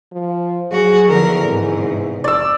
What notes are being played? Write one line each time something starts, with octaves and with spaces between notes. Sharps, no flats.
F3
F#3 F#4 G#4
E2 D3 F3 A#4
G#2 C3
C3
F1 D5 E6